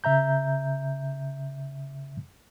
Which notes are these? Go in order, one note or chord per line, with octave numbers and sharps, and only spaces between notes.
C#3 E5 A#5 G6